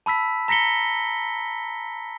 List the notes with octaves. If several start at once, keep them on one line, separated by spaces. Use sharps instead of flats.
A5 B5 E6 B6
A#5 A#6 B6 C#7 G7